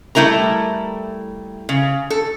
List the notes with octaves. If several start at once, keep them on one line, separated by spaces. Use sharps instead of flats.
G3 A3 E4 A#4 A#5
C#3
A4